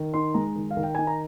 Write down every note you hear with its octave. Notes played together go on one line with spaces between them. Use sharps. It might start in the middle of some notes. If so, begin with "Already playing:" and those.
Already playing: D#3
D#4 C6
G#3 A#5
D#3
F5
D#3
G5
D#4 G#5
A#5